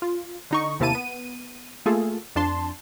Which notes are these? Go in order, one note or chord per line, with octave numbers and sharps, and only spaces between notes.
F4
D3 D#4 C#6
D#2 C3 A#3 E4 A5 D#7
B3 D#7
A3 A#3 F4 G#4 A4
F2 D4 A5 C6